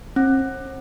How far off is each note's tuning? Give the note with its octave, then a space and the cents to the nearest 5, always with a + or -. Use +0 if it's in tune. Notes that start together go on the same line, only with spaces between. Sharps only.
C4 +40